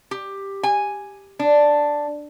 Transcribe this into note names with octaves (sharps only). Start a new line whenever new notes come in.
G4
G#5
D4